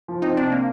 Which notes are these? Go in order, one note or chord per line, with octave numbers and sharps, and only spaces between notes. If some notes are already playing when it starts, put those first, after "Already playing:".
F3
C4 D#4
C3 D4
A#3